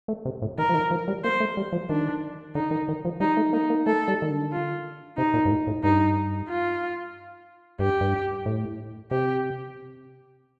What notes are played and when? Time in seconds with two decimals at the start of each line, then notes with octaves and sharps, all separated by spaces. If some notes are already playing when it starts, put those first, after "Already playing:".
0.08 A3
0.25 C3
0.42 A2
0.58 D#3 A#4
0.69 F3
0.74 D#3
0.91 F3
1.08 G3
1.24 A#3 C5
1.40 A3
1.57 G3
1.72 F3
1.89 D#3 D4
2.55 D3 D#4
2.71 D#3
2.88 D#3
3.05 F3
3.20 G3 D#4
3.37 A3
3.53 A#3 D#4
3.70 A#3
3.86 A3 A4
4.08 G3
4.22 D#3
4.30 D3
4.52 F4
5.17 C3 D#4
5.34 A#2
5.45 G2
5.51 A2
5.67 A2
5.83 G2 D#4
6.48 F4
7.79 G2 G4
8.01 G2
8.46 A2
9.11 C3 G4